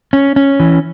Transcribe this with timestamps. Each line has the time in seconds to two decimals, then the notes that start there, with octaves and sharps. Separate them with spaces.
0.13 C#4
0.36 C#4
0.60 E3